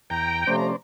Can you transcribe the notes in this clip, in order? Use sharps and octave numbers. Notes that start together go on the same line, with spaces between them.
E2 G5 A#5
C3 F3 A3 C#4 C5 D5